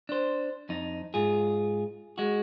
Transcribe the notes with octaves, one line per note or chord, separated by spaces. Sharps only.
D4 C5
F2 D#4
G#2 F4 G#4
G#3 F#4